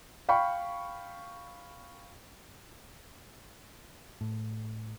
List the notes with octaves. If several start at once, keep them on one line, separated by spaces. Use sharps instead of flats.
F5 G5 B5 C#6
A2